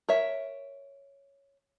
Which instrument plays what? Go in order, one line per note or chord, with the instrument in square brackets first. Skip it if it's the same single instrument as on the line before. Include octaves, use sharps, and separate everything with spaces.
[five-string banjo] A#4 C#5 E5